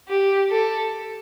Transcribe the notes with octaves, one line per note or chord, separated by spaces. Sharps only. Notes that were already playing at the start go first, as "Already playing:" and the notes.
G4
A4